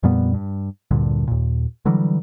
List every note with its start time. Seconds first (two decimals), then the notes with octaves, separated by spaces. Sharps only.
0.03 F2 A#2 G3 B3
0.34 G2
0.91 D2 G2 A#2 D3
1.27 D#2 A#2
1.85 D3 E3 F#3 G3